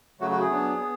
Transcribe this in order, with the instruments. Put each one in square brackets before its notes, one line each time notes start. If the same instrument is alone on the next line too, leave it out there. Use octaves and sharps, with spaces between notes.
[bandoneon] C#3 F#3 A3 F#4
F#4
G#4
F#3 B3 D4
B3